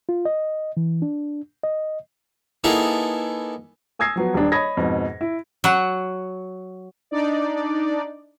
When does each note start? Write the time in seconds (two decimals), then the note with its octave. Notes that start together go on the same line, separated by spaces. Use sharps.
0.09 F4
0.25 D#5
0.77 E3
1.02 D4
1.64 D#5
2.64 A#3 B3 D#4 E4 G#4 A4
3.99 G#5 D#6 E6 G#6 A#6 C7
4.16 F3 F#3 B3
4.34 D#1 D4
4.52 C#5 D#5 B5 D#6 G#6 A#6
4.77 F2 G#2 B2
5.21 E4
5.64 F#3 F#5
7.11 D4 D#4 D5